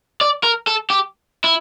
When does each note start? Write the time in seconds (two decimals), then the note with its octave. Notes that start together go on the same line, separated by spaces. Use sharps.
0.21 D5
0.43 A#4
0.67 A4
0.90 G4
1.44 E4